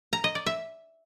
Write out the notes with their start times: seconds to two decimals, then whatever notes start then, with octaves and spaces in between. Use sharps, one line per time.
0.13 A#5
0.24 D#5
0.35 D5
0.46 E5